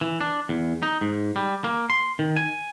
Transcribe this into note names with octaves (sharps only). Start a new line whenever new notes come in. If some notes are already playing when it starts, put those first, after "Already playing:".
E3
D4
E2
D#4
G#2
G3
A#3
C6
D#3
G#5